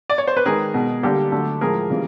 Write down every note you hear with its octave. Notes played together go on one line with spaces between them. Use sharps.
D5
C#5
C5
B4
D#3 G#3 G#4 A#4
B2 G#3
D3 G3 A#3 G4 A4
D3 F#3 A3
A2 F3 G#3 G#4 A#4
C#3 E3 G3 A#3